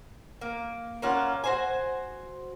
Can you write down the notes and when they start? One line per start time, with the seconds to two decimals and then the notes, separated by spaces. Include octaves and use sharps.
0.41 A#3
1.02 A#3 C#4 F4 F#5
1.44 F#4 C5 G#5